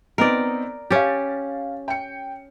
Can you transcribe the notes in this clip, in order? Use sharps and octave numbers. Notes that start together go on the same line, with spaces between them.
B3 C4 D#4 A#4 D5
C#4 G4 F5 A6
G5 C#7